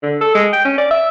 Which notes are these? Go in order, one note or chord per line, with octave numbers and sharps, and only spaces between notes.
D3
A4
G#3
G5
C#4
D5
E5